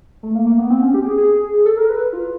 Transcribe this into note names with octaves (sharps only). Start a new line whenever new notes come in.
A3
A#3
A#3
B3
C4
C#4
G4
G#4
G#4
A4
A#4
B4
F4